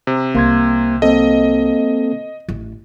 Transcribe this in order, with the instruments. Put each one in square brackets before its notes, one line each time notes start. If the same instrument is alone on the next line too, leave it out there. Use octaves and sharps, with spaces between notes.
[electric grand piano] C3
[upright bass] C2 [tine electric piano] A#3 C6 G#6
[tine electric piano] A#3 C4 A4 [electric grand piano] D#5
[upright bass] A1 A2